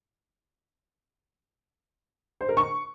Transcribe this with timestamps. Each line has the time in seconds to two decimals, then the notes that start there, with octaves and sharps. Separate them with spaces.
2.41 C5
2.49 A#4
2.57 C#6